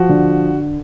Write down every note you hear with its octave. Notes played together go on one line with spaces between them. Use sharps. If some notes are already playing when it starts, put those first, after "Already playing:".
Already playing: F3 F#4
D3